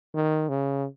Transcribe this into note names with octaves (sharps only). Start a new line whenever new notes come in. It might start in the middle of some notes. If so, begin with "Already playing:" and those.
D#3
C#3